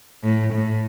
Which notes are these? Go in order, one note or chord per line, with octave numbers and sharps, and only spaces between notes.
A2
A2